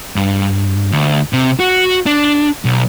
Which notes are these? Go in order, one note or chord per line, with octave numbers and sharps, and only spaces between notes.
G2
D2
C3
F#4
D4
B1